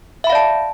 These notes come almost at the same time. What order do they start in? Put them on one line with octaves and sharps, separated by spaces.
E5 B5 F5 D5 A5